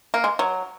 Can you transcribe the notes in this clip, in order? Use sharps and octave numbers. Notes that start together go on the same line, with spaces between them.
A#3
G#3
F#3